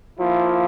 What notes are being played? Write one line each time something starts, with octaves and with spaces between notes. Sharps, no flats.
F3 A#3 E4